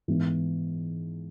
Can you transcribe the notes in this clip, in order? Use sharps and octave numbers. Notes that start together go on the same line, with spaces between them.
G#2 E3 B3